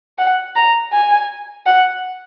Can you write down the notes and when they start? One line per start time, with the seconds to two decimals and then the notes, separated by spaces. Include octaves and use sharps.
0.18 F#5
0.55 A#5
0.93 G#5
1.66 F#5